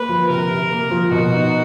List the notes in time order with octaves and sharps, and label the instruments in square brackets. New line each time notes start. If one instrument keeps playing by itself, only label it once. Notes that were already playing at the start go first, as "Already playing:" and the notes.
Already playing: [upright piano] A#3 [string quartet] B4
[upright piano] F3
[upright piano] C3 [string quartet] A#4
[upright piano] C3
A#3
F3
[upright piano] B2 [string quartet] F#4
[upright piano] D#4